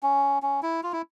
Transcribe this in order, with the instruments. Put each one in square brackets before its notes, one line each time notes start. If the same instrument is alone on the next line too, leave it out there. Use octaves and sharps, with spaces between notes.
[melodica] C#4
C#4
E4
F4
E4